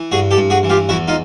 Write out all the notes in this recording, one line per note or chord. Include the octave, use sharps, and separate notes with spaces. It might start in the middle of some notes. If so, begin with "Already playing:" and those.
Already playing: E3
G2 F#4 G#4
G4 A4
G2
F#4 G#4
E3
F4 G4
E2 E4 F#4
D#4 F4